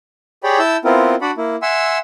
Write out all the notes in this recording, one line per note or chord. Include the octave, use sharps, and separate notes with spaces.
G4 G#4 C#5 D5 G5 B5
E4 A5 E6 G6
B3 C4 E4 F4 A#4
D4 F#4 D5 F#5 B5
A#3 E4
E5 F#5 G#5 C6 E6